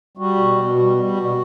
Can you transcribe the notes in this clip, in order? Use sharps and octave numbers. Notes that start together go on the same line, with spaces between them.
G3 F#4
B2
B2
G3
G3
B2